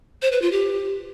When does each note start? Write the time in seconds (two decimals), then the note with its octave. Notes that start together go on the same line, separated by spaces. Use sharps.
0.22 C5
0.32 B4
0.42 F4
0.52 G4